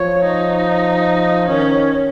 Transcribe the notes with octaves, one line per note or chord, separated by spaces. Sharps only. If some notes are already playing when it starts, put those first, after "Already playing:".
Already playing: F3 C#5
D#4
D#3 C#4